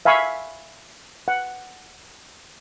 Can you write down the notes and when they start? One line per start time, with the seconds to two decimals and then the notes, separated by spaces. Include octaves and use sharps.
0.05 E5 F5 G#5 B5 C#6
1.28 F#5